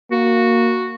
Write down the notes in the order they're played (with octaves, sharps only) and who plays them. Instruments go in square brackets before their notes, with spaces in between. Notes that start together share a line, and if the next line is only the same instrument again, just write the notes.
[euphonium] A#3 [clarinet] F#4